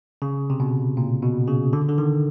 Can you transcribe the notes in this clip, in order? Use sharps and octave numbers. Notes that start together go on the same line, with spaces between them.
C#3
C3
B2
A#2
B2
C#3
D3
D3
D#3